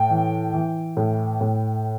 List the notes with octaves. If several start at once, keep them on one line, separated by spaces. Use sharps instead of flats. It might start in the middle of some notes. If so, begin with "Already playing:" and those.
Already playing: A2 G5
E3
E3
A2
A2